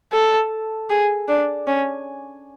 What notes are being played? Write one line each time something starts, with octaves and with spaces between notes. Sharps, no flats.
A4
G#4
D4
C#4